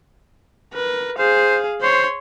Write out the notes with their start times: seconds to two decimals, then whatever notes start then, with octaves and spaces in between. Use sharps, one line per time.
0.74 A#4 B4
1.18 G#4 C5 F5
1.81 C5 C#5 C6